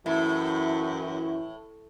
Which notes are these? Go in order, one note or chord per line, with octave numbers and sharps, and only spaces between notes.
F#2 A2 E3 E4